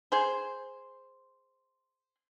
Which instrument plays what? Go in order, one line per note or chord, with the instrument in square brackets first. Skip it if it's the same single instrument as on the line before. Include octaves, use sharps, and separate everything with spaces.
[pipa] G#4 C5